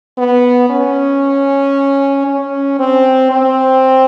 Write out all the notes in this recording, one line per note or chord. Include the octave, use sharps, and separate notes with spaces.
B3
C#4
C#4
C4
C4